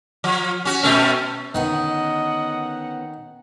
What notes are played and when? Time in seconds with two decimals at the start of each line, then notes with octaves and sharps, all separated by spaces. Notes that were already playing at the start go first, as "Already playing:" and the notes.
0.24 F3
0.65 C#4 F#4
0.83 B2 A3 C#4
1.55 D3 D#3 B3 C#4 D#5 F#5